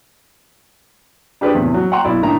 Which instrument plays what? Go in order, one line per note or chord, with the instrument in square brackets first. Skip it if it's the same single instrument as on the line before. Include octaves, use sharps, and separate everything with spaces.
[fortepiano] D4 G4 G#4 B4 C5 D5
E2 A2 C3
F#3
F#5 G5 A#5 C6
B1 E4 D5
A2 D#3 D4 E5 A#5